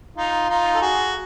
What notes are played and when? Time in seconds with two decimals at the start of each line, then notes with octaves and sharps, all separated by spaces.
0.16 D#4 F4
0.49 D#4 F4
0.75 A4
0.81 F#4 G#4